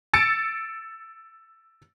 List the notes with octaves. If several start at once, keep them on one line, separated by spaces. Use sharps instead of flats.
E6 A6 C#7 D7